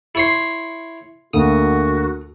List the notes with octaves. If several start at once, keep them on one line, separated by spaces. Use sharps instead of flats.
E4 C#5 C6
D2 A#3 F#4 D#6